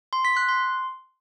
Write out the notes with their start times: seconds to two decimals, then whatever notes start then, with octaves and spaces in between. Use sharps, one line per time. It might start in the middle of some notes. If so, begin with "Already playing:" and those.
0.13 C6
0.25 B6
0.37 F#6
0.49 C6